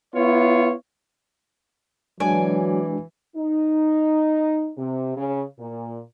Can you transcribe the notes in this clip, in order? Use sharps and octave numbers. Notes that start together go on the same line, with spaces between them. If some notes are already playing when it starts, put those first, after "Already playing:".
B3 E4 F4 C#5
E3 F#3 G#3 D4 F#4 D5 G#5
D#4
C3
C#3
A#2